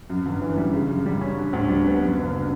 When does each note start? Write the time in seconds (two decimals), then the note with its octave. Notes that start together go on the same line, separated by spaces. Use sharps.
0.10 F#2
0.26 G1
0.42 E3
0.57 G3
0.74 C#3
0.90 F#2
1.06 G3
1.21 C#4
1.37 D3
1.53 D2
1.69 G3
1.85 B3
2.02 F#2
2.18 F#1
2.34 D3